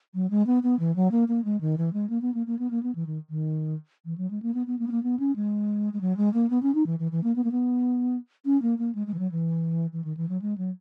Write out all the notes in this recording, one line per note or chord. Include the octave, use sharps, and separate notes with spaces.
F#3
G#3
B3
B3
E3
F#3
A#3
A#3
G#3
D#3
E3
G#3
A#3
B3
A#3
A#3
B3
A#3
B3
E3
D#3
D#3
E3
F#3
G#3
A#3
B3
B3
A#3
B3
A#3
B3
C#4
G#3
G#3
F#3
G#3
A#3
B3
C#4
D#4
E3
E3
E3
A#3
B3
A#3
B3
C#4
A#3
A#3
G#3
G#3
E3
F#3
E3
E3
D#3
E3
F#3
G#3
F#3